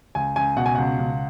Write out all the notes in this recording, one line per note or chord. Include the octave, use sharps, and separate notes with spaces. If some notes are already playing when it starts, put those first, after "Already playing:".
C#2 G#5
C#2 G#5
B2 F#5
G#5
C#2 F#5
C#2